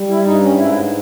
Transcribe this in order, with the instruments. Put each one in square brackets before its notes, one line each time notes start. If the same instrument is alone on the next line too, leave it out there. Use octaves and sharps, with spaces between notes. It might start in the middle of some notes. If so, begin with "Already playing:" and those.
Already playing: [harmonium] G3
E4
G2 D#4
C#4
G#2 E4